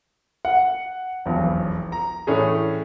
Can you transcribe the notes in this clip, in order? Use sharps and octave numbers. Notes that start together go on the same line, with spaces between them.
F#5
E1 B1 F2
A#5
A2 E3 A3 C#4 D4 G#4